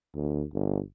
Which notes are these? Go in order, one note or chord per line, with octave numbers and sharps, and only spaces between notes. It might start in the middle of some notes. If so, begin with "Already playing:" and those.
D2
G1